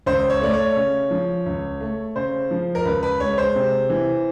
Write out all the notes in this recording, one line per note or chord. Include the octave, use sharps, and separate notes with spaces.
C#2 C5
C#5
A3 D5
C#5
C#3
F3
C#2
A3
C#3 C5
F3
A#4
C#2 B4
B4
G#3 C#5
C5
C3
E3